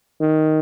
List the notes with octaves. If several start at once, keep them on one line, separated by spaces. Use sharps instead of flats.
D#3